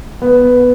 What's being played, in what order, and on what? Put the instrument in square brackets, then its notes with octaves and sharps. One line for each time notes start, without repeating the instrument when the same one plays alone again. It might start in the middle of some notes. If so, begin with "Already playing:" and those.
[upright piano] B3